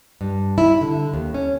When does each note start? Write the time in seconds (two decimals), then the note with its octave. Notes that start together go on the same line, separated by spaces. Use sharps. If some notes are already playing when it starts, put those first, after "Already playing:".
0.21 G2
0.58 E4
0.81 D3
1.14 D#2
1.34 C#4